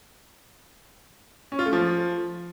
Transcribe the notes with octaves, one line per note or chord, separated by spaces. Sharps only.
C#4
F4
A3
F3